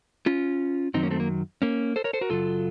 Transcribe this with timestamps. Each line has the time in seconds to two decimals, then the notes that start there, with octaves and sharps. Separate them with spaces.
0.26 C#4 F4
0.94 F#2 D#3 F#3 C4 D#4
1.03 A#3 C#4
1.11 A3 C4
1.20 A#3
1.62 A#3 C#4
1.96 A4 C5
2.04 A#4 C#5
2.13 A4 C5
2.21 F#4 A#4
2.30 F#2 C#3 F#3 F4 A4